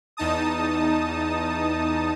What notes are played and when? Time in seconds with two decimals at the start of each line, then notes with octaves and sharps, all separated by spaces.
0.17 E2 D#4 A5 D#6